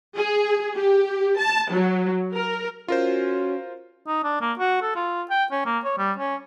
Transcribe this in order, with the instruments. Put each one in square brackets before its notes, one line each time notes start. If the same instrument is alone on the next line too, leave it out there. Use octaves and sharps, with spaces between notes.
[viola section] G#4
G4
A5
F#3
A#4
[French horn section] C#4 F#4 [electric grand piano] F4 A#4 C5
[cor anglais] D#4
D4
A#3
F#4
A4
F4
G5
C#4
A#3
C#5
G3
C#4